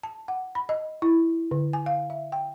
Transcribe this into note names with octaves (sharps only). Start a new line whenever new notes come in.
A5
F#5
B5
D#5
E4
D3
G#5
F5
E5
G5